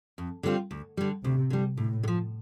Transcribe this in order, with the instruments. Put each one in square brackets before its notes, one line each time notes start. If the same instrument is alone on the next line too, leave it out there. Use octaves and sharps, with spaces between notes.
[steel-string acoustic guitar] F2
D3 G3 C4 F4
D2
D3 G3
[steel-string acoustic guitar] D2 [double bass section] C3
[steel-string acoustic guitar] D3 G3
[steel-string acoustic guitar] D2 [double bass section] A2
[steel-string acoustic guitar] D3
F3